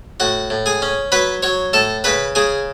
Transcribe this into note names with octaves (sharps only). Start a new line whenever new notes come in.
A2 F#4 F#5
A2
G#4 G#5
C#4
F#3 B4 B5
F#3 C#5 C#6
A2 A4 A5
C#3 B4 B5
C#3 G#4 G#5